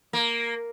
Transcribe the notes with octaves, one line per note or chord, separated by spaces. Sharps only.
A#3